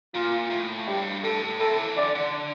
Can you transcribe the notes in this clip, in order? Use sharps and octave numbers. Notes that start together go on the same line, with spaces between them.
A#2 F4
A2
G2 G4
A2 A4
C3 A4
E3
D3 D5
D3